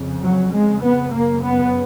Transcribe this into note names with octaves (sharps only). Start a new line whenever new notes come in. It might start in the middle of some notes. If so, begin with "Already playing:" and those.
Already playing: F2 C#3
F#3
G#3
B3
F#2 C#3 A#3
B3